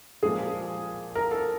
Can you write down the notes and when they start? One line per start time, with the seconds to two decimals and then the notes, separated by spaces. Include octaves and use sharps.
0.23 A#2 F3 G#3 G#4
1.15 A#4
1.31 A4